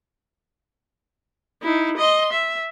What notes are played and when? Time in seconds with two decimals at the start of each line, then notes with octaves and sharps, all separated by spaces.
1.62 D#4 E4
1.97 D#5 C6
2.32 E5